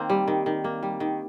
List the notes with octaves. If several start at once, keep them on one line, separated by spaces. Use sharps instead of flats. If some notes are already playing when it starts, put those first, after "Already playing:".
Already playing: D#3 A#3 C4
G3
D#3
D#3
A#3
G3
D#3